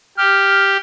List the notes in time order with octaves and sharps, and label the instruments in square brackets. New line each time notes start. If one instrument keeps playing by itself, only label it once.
[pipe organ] G4 [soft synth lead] F6